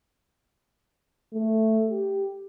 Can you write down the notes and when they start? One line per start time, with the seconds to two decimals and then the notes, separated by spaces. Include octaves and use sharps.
1.33 A3
1.89 G4